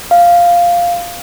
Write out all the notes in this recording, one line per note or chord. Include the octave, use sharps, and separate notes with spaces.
F5